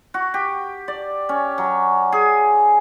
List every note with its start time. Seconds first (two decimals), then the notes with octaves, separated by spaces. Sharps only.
0.14 F#4
0.34 G4
0.88 D5
1.29 C#4
1.58 F#3
2.12 G#4